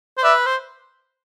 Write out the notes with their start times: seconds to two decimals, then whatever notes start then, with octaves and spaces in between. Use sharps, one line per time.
0.18 C5
0.23 B4 D5 E5
0.46 C5